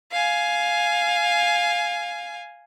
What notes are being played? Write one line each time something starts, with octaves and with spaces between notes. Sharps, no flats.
F5 G#5